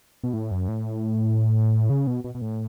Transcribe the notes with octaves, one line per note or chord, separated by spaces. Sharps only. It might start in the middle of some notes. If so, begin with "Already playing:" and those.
B2
A2
F#2
A2
C#3
B2
B2
B2
A2